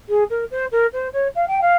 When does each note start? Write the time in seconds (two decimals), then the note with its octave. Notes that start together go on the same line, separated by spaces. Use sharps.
0.09 G#4
0.30 A#4
0.51 C5
0.72 A#4
0.93 C5
1.13 C#5
1.35 F5
1.48 G5
1.61 F5